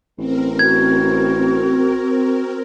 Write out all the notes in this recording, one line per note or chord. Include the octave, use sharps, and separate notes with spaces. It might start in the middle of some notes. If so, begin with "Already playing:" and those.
A1 C4 A#4
F#4 G#6